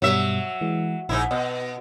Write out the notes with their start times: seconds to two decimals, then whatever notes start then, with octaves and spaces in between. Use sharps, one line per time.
0.02 G2 B2 F#3 G3 E5
0.61 E3 G#3
1.09 A#1 G#2 D#4 E4
1.31 B2 D#5